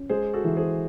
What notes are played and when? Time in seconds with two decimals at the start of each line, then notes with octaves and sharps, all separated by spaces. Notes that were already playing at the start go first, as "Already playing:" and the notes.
Already playing: C#4
0.10 G#3 G#4 C5
0.33 F#4 A4
0.44 E3
0.57 G#4 C5